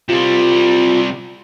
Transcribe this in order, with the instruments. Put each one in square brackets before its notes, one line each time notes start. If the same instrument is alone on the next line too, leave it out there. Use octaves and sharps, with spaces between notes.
[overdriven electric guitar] C3 G3 [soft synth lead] F4